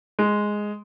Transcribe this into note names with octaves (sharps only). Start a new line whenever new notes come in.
G#3